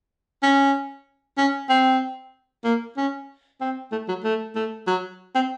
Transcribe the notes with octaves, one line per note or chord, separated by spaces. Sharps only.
C#4
C#4
C4
A#3
C#4
C4
A3
F#3
A3
A3
F#3
C4